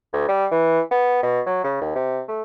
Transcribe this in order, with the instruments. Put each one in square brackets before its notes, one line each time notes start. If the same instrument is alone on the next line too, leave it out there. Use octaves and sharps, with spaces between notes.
[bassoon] D2
G3
E3
B3
B2
F#3
C#3
D#2
C3
A3